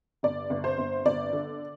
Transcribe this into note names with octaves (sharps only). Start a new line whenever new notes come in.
G1 D5
G1
C5
G1
G1 D5
D3